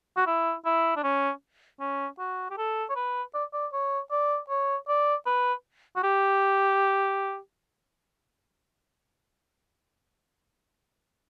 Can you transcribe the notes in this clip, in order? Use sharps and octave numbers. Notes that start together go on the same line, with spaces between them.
F#4
E4
E4
D4
C#4
C#4
F#4
G4
A4
C#5
B4
D5
D5
C#5
D5
C#5
D5
B4
F#4
G4